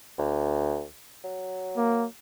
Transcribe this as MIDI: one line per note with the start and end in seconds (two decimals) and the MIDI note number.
0.18 0.85 38
1.24 2.05 54
1.77 2.07 58